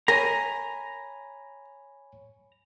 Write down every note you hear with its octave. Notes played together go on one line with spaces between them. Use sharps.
A#4 C#5 G#5 A#5 B5